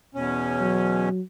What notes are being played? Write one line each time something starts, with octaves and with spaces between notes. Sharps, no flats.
E2 B2 C#4
F#3